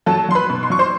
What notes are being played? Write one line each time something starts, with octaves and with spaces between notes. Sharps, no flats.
F#3 A4 A5
F#3 C6
B4 B5
B2
C6
F#3 C#6
C5 C6